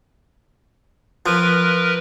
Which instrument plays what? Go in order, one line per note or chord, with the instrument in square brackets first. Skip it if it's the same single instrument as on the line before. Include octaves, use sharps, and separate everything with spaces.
[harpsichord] F3 [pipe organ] A#4 B4